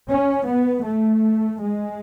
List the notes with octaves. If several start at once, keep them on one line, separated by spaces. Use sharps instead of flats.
C#4
B3
A3
G#3